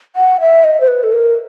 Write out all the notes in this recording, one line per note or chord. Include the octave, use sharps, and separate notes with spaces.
F#5
E5
D#5
C5
B4
A4
A#4